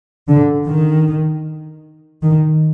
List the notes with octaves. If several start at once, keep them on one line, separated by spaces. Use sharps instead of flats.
D3
D#3
D#3